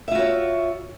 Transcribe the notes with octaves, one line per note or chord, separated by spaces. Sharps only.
F4 F#4 C#5 E5